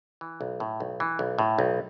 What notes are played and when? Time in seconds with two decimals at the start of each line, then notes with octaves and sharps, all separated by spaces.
0.21 E3
0.41 B1
0.60 A2
0.80 B1
1.00 E3
1.19 B1
1.39 A2
1.59 B1